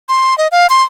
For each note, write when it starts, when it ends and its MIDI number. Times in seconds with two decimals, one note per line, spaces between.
0.09 0.37 84
0.38 0.48 75
0.52 0.67 77
0.70 0.83 84